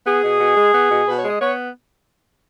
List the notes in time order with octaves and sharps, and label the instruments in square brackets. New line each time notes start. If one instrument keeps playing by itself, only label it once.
[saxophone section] B3 G#4
B2
B2
G#3
B3
B2
B2 B4
C#5
G#3
D#5
B3 C#5